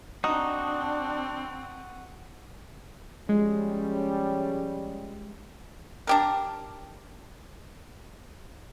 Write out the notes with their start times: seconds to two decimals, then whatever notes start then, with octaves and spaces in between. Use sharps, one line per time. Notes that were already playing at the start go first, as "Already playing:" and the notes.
0.24 C4 D4 D#4 F#4 D#6
3.29 F3 G3 G#3 C#4
6.07 D4 G4 A#4